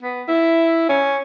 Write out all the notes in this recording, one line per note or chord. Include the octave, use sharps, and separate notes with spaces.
B3
E4
C#4